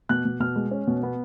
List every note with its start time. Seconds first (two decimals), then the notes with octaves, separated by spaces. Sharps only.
0.09 B2 F#6
0.25 B2
0.40 B2 F6
0.56 G#3
0.71 C#4
0.87 B2
1.03 B3